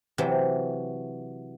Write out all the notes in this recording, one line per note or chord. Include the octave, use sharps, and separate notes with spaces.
C3 E3 F#3